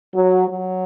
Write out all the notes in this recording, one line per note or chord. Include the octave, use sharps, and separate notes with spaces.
F#3
F#3